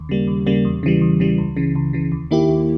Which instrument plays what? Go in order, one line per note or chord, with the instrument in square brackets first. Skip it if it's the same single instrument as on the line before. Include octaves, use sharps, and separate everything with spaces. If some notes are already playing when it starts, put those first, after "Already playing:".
Already playing: [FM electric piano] D#2
C#3 G3 A#3
D#2
C#3 G3 A#3
E2
C#3 E3 G3
E2
C#3 E3 G3
C#2
C#3 E3
C#2
C#3 E3
D#2
D#3 A#3 E4 G4
D#2